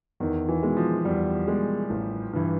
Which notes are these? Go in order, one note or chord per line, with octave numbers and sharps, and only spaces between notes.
E2 D#3
E3
B2 G#3
F3
E2 G3
B2 G#3
A1
G2 E3